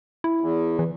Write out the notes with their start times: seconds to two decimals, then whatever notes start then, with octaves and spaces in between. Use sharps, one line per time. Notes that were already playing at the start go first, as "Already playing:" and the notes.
0.24 E4
0.41 E2
0.79 E3